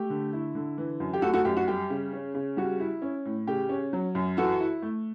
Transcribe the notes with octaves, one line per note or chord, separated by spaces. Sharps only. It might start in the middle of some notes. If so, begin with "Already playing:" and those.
Already playing: A3 G4
D3
E4
D3
E3
F#2
G4
A3 F#4 A4
F#4 A4
F#2 G4
F#4
G3 G4
C#3
C#4
C#3
G3 F#4
E4
C#4
A2
C#3 G4
C#4
F#3
F#2
E3 F#4 A4
E4
A3